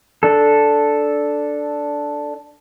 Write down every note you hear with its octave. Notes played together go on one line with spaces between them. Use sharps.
D4 A4